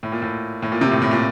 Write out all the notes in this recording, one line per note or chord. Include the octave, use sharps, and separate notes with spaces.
A2
A#2
A2
A2
A#2
C3
A2
A2
A#2